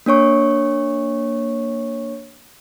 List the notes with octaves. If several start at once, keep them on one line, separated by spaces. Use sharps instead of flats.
A#3 D4 C#5 C#6